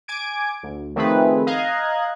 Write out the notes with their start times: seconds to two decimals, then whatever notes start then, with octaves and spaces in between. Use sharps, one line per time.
0.08 G#5 D6 G#6 D7
0.63 D2
0.96 D#3 F3 A3 C4 G#4 B4
1.47 D#5 F5 A#5 F#6 G#6